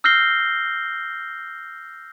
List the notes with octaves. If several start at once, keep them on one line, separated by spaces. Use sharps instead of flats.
E6 F6 G6 A#6 C7 G7